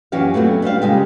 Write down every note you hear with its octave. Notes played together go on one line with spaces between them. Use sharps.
F#2 E3 C#4 F#4 G4 F5
F#3 A3 B3 C4
G3 D4 C5 F5
C#3 G#3 G4